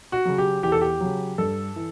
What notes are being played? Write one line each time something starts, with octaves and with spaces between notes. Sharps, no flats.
F#4
C#3 F#3
G4
E2 G4
A4
G4
C#3 F#3
G2 A4
E3